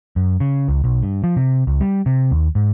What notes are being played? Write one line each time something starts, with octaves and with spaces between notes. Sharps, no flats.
F#2
C#3
C#2
B1
G2
F3
C3
C#2
G3
C3
D#2
G#2